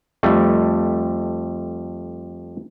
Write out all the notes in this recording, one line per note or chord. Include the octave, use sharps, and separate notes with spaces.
F2 G3 A3